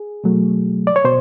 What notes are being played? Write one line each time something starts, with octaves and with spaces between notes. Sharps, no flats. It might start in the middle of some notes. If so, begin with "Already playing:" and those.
Already playing: G#4
B2 F#3 A3
D5
C#5
B2 C5